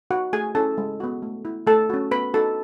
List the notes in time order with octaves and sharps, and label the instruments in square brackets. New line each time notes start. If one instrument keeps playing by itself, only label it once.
[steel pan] D#4 F#4 F#5
A3 G#4 G#5
C#4 E4 A4 A5
G#3
B3 F#4
A3
E4
A3 A4 A5
C#4 F#4
B3 B4 B5
D#4 F#4 A4 A5